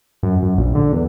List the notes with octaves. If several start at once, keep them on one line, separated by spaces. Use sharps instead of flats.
F#2
F#2
A#1
D3
E2